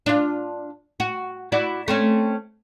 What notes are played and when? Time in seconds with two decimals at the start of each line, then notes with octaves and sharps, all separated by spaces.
0.06 D4 F4
1.00 F#4
1.52 E4 F#4 D5
1.88 A3 C4 C#4